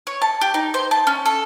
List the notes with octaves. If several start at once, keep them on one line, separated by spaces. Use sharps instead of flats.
C#5
A5
G4
D#4
C5
A5
C#4
A4